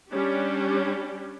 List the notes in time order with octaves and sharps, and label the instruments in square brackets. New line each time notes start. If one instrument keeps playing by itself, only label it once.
[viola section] G3 C#4 D4 G4